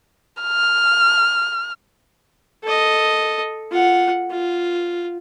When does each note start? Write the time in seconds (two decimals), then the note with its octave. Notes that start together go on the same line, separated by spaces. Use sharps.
0.42 F6
2.63 A4 D#5
3.71 F4 F#5
4.31 F4